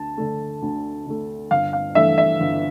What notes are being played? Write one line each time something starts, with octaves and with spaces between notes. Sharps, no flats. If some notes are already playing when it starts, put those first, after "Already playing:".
Already playing: D2 A5
D3 A3
D2
D3 A3
G1 F5
F5
G2 E3 A3 E5
E5
G1